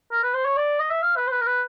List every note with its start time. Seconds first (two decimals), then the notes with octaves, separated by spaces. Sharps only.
0.12 A#4
0.23 B4
0.34 C5
0.45 C#5
0.57 D5
0.80 D#5
0.90 E5
1.02 F5
1.17 B4
1.27 C5
1.32 B4
1.41 A#4
1.46 B4